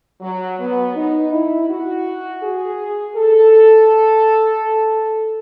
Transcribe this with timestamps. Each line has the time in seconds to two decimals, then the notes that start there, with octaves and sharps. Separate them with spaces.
0.21 F#3
0.59 B3
0.95 D#4
1.32 E4
1.68 F#4
2.42 G#4
3.15 A4